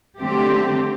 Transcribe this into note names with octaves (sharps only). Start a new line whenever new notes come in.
D3 F#3 A3 C4 G4